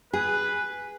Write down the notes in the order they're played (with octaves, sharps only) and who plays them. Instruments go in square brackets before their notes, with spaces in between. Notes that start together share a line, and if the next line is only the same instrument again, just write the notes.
[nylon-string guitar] G#4 [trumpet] B4